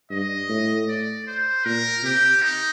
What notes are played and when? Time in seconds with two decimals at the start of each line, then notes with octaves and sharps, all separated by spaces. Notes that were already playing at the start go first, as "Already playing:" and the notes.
0.10 G2 D#5
0.49 A2
0.88 D5
1.27 C5
1.65 A#2 A#4
2.03 C3 G4
2.42 D#4